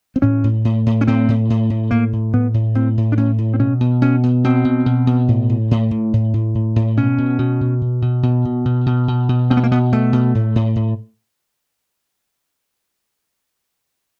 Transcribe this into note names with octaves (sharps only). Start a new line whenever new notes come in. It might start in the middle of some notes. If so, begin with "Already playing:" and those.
C4
A2 C#4
A2
A2
A2
C#4
A2 C4
A2
A2
A2
A2 A#3
A2
A2 B3
A2
A2 C4
A2
D4
A2 C#4
A2
C4
B2 C#4
B2
B2 C#4
B2
B2 C4
B2
B2
B2
A2
A2
A2
A2
A2
A2
A2
A2
B2 C#4
B2
B2
B2
B2
B2
B2
B2
B2
B2
B2
B2
B2 C4
B3
A#3
B2 B3
B2 A3
B2
A2
A2
A2